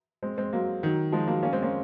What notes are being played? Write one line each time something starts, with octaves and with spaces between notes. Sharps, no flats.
G#3 C4
G#3 C4
F#3 A#3
D#3 F#3
F3 G#3
F#3 A#3
A#3 C#4
G#3 C4
A#3 C#4